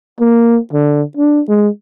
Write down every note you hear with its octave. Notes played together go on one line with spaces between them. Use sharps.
A#3
D3
D4
G#3